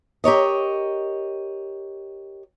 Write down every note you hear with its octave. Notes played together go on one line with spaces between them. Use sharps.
G4 A#4 C#5 D#5